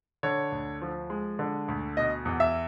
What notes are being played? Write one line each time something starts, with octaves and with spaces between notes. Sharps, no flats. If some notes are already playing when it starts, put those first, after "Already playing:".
D3 C#5
D2
F3
G#3
D3
D2
B2 D#5
E2
E5